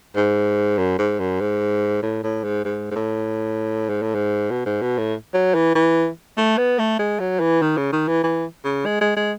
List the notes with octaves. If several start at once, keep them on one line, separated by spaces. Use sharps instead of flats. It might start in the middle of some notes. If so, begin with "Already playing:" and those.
G#2
F#2
G#2
F#2
G#2
A2
A2
G#2
G#2
G#2
A2
G#2
A2
G#2
B2
G#2
B2
A2
F#3
E3
E3
A3
B3
A3
G#3
F#3
E3
D#3
C#3
D#3
E3
E3
C#3
G#3
G#3
G#3